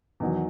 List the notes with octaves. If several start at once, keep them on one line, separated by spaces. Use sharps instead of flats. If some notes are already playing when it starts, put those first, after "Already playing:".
E2 D#3 F#3